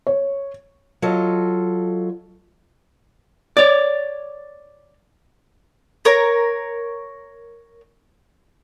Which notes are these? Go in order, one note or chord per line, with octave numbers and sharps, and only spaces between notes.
C#5
F#3 F4 A4 D#5
C#5 D5
A#4 C#5